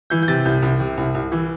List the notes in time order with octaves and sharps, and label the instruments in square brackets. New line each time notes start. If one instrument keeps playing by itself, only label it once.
[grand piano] E3 G6
G6
C3 A6
C2 G6
C2
C3
C2
C2
E3